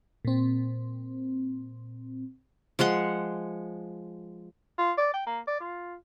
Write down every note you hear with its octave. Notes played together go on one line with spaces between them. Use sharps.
A#2 C4
F3 G#3 F#5 C6
F4
D5
G5
A#3
D5
F4